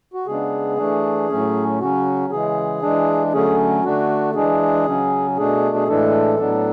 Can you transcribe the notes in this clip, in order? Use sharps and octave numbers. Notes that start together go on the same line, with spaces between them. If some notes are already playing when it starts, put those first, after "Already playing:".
F#4
C#3 G#3 B3 D4 G#4
E3 A3 D4
A2 F#3 A3 C#4
C#3 F#3 C#4 F#4
C#3 E3 G#3 G#4
E3 G#3 D4
D3 F#3 A3 C#4 G#4
D3 A3 D4 F#4
E3 G#3 D4 G#4
C#3 F#3 C#4
B2 A3 D4 G#4
G#4
A2 E3 G#3 D4 A4
A2 F#3 B3 D4